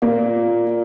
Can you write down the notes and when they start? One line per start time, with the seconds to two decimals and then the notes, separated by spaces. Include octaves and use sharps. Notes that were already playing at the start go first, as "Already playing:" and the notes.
0.02 A#2 A#3 F4 D5 F5
0.67 F4 D5